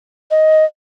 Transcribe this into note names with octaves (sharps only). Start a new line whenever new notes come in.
D#5